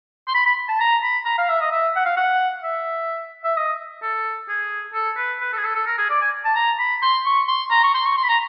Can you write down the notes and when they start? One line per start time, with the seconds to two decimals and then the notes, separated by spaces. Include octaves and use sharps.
0.28 C6
0.35 B5
0.46 B5
0.69 A5
0.80 A#5
1.03 B5
1.26 A#5
1.38 F5
1.49 E5
1.61 D#5
1.72 E5
1.96 F#5
2.05 F5
2.17 F#5
2.64 E5
3.44 E5
3.57 D#5
4.03 A4
4.49 G#4
4.94 A4
5.17 B4
5.40 B4
5.53 A4
5.58 G#4
5.64 A4
5.75 A4
5.86 A#4
5.98 G#4
6.10 D5
6.21 G#5
6.45 A5
6.55 A#5
6.79 B5
7.02 C6
7.26 C#6
7.48 C6
7.71 A#5
7.84 C#6
7.95 C6
8.05 C#6
8.17 C6
8.24 B5
8.29 A#5